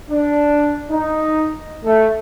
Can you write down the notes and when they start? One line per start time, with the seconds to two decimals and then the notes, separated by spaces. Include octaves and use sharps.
0.10 D4
0.90 D#4
1.85 A3